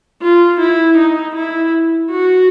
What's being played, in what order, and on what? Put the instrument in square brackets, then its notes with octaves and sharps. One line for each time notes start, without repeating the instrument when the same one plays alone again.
[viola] F4
E4
D#4
E4
F#4